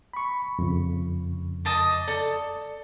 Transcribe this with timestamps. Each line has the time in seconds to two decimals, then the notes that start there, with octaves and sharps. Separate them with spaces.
0.14 B5 C#6
0.59 F2 C#3
1.65 D#5 A5 D6
2.08 A4 D5